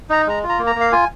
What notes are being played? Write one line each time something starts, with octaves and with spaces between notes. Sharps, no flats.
D#4 A#5
G#3 A#5
F4
A#5
A#3
A#5
A#3
F5
F4 G#5